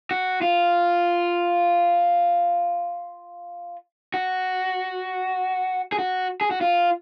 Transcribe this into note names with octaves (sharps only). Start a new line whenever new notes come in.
F#4
F4
F#4
G#4
F#4
G#4
F#4
F4